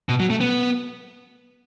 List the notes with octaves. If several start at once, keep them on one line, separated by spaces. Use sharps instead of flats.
B2
F#3
A3
B3